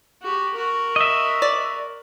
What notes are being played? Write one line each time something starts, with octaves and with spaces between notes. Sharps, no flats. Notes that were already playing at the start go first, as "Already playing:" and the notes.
F#4 G4
F#4 A#4
D#5 E5
D5